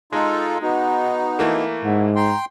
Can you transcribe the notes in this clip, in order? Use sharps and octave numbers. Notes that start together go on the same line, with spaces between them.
G#3 D#4 F4 A4
B3 D#4 F#4
E3 A3 A#3
G#2 F#5
G5 A#5 C6